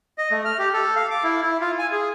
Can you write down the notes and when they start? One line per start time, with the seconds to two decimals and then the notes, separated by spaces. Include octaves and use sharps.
0.18 D#5
0.31 A3
0.45 F6
0.59 G4
0.73 A4
0.96 F5
1.11 D6
1.24 E4
1.43 E4
1.60 F4
1.79 G#5
1.92 G#4